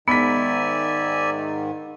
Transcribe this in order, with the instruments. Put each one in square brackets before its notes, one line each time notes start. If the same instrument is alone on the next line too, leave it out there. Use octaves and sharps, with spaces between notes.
[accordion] G#2 D#3 [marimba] B3 [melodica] D5 E5 G#5 [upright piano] B5 B6